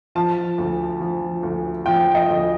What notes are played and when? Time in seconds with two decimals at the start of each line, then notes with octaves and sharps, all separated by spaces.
0.15 F3 A5
0.58 D2
1.01 F3
1.43 D2
1.86 F3 G5
2.15 D#5
2.29 D2